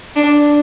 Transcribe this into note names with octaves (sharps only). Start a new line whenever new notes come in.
D4